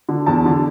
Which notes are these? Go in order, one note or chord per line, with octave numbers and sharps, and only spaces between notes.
D3
E2 A5
D3